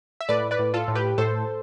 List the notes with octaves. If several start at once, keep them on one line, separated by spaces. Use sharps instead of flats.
E5
A2 B4 D5
B4 D5
A2
F4 A4
A2
G4 B4
A2 A4 C5